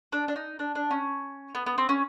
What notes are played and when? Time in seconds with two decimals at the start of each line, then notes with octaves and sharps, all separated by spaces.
0.12 D4
0.28 D4
0.36 D#4
0.59 D4
0.75 D4
0.91 C#4
1.55 B3
1.66 B3
1.78 C4
1.89 C#4